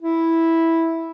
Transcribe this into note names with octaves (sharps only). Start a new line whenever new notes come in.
E4